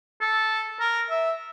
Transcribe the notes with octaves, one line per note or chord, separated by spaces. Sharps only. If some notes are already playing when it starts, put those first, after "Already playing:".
A4
A#4
E5